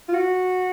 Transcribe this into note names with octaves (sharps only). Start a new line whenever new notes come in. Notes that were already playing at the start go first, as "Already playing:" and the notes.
F4
F#4